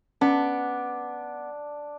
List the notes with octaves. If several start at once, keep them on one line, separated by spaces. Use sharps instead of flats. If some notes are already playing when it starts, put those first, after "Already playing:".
B3 C#4 D4